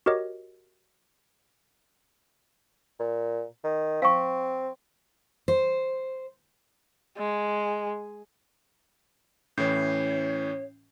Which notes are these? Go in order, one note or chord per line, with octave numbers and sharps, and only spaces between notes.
F#4 G4 A#4 C#5 D#5
A#2
D#3
C4 F5 C#6
C5
G#3
A2 E3 C#4 C#5 G6 C7